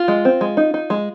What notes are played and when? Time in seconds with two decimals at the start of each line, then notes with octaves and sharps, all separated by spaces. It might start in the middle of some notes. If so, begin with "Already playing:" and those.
Already playing: F4
0.08 G#3
0.25 C4
0.41 G#3
0.57 D#4
0.74 D#4
0.90 G#3